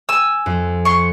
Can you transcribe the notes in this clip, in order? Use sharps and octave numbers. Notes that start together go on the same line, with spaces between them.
G#5 E6
F2
C6 C#6